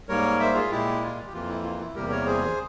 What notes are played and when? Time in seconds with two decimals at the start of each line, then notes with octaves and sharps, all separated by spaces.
0.09 G#2 G3 A#3 A#4 C#5
0.40 C5 E5
0.55 F4 G#4
0.71 A#2 G#3 E4 G4
1.02 F4
1.27 G4
1.33 F2 E3 A#3 F4
1.49 E4
1.63 F4
1.79 E4
1.95 E2 C3 G3 A#3 G4 A#4
2.10 A#4 C#5
2.26 G#4 C5